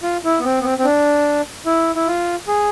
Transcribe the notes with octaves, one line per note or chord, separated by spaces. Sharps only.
F4
E4
B3
C4
B3
C4
C4
D4
E4
E4
F4
G#4